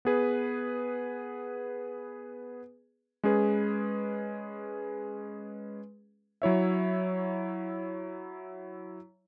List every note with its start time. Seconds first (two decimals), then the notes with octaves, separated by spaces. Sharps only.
0.05 B3 G#4 B4
3.24 G#3 C#4 G#4 B4
6.42 F#3 E4 C#5 E5